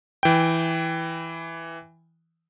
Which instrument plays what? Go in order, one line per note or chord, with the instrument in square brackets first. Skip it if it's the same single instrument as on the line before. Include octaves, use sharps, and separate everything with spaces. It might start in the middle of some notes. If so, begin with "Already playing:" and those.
[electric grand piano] E3 G5